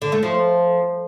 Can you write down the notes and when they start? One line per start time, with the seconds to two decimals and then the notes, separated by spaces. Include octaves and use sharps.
0.02 D3
0.12 A3
0.23 F3